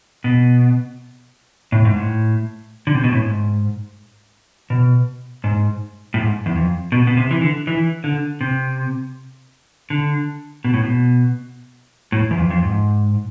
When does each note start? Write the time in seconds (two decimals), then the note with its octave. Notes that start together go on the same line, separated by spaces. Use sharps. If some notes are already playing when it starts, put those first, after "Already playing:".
0.24 B2
1.72 A2
1.85 G#2
1.96 A2
2.87 D3
2.95 C3
3.04 B2
3.12 A2
3.22 G#2
4.70 B2
5.44 G#2
6.14 A2
6.18 G#2
6.46 E2
6.56 F2
6.92 B2
7.07 B2
7.17 C3
7.31 E3
7.42 D3
7.67 E3
8.04 D3
8.41 C3
9.90 D3
10.65 B2
10.74 A2
10.84 B2
12.12 A2
12.31 E2
12.37 F2
12.50 F2
12.63 G#2